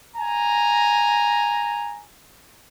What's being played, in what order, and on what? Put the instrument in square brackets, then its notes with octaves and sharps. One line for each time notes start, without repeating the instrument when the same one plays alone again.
[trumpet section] G#5 A#5